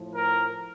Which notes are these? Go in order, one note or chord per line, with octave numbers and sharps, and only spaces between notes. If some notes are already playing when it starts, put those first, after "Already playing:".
Already playing: A2 F3
A#4